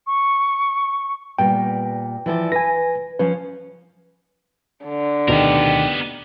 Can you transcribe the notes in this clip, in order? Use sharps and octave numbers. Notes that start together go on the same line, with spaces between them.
C#6
A#2 G3 B3 G5
E3 F3 D5
B4 G#5 A#6
F3 C#4 B4
D3
D2 B2 D#3 B3 G4 A#4